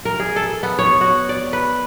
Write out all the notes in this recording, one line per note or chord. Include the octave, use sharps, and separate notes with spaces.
A#4
G#4
A4
B3
C#5
F#4
D5
B4